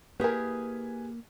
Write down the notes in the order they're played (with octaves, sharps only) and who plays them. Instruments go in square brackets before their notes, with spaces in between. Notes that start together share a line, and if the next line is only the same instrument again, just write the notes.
[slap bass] A#3 [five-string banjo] E4 A#4 [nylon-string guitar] G4 G#4 [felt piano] B4 G#5